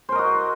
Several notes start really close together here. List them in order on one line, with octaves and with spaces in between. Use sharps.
C5 A#4 D#5 F#4